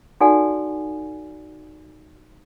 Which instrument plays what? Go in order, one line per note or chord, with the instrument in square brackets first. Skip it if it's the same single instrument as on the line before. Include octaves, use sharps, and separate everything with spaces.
[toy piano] D#4 F#4 A4 D5 F#5 G#5